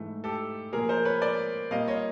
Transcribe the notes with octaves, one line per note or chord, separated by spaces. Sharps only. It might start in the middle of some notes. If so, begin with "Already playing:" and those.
Already playing: G#2 E3 A3
G4 A4
A#2 F3 A#3 G#4 A#4
A#4 C5
B4 C#5
C5 D5
A#2 G3 A#3 D#5 F5
C#5 D#5